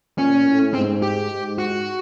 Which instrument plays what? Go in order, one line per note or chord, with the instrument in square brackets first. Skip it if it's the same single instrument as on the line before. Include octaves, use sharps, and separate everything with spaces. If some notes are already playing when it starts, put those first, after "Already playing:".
[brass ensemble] A#2 [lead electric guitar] C#4
[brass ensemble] A2
[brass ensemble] G#2 [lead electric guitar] C4
[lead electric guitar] G4
[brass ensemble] G#2
[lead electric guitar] F#4